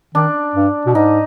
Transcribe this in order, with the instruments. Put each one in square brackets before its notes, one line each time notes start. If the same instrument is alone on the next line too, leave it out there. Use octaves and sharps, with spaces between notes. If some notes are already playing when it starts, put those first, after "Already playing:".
[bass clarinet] D#3 [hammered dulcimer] D4
[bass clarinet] G2
B2
[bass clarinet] G#2 [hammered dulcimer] D#4